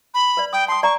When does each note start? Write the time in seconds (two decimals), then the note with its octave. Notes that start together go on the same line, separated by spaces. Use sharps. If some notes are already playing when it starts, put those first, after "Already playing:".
0.14 B5
0.37 B4 D5
0.53 G5 D#6
0.68 A5 C6 D#6
0.83 D5 A#5 C#6